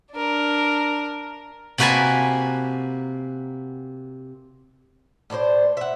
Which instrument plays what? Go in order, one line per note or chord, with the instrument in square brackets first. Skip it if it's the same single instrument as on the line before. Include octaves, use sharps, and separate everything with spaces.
[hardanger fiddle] D4 A#4
[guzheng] C3 A#3 F#4 B4 G#5 A5
[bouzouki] A2 D4 F4 C5
E5 F#5